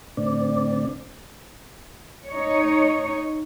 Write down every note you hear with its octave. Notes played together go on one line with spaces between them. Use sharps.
A2 D3 C4 D5
D#4 C#5